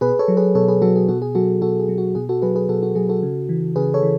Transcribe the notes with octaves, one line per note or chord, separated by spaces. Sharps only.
B2 G#4 B4
A4 C#5
F#3
G#4 B4
B2 A4 C#5
G#4 B4
F#3 F#4 A4
G#4
B2 F#4 A4
G#4
F#3 F#4 A4
B2 F#4 A4
G#4
F#3
F#4
B2 G#4
F#4 A4
F#3 G#4 B4
G#4 B4
B2 F#4 A4
F#4
F#3 G#4
F#4 A4
C#3
E3
C#3 G#4 B4
A4 C#5
E3